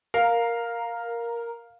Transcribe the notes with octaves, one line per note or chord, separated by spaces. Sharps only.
A#4 F5